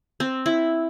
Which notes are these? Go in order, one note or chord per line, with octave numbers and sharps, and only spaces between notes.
C4
E4